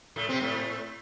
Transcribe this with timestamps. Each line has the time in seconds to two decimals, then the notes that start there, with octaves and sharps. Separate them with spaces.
0.16 A2 A3
0.29 C3 C4
0.41 A2 A3